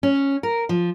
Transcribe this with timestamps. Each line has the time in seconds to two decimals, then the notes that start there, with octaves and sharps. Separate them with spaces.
0.03 C#4
0.43 A#4
0.69 F3